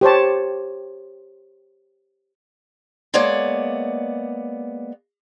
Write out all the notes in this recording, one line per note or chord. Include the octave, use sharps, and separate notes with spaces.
G4 C5 C#5 A5
G#3 A#3 B3 C#5 D5